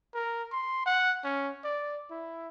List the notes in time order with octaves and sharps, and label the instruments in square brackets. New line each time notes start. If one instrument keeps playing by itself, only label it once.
[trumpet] A#4
C6
F#5
C#4
D5
E4